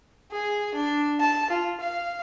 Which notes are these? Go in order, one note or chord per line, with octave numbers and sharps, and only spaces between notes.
G#4
D4
A5
F4
F5